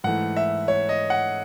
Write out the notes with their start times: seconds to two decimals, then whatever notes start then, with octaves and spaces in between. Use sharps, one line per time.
0.04 G#2 E3 A3 F#5
0.37 E5
0.68 C#5
0.89 D#5
1.10 F#5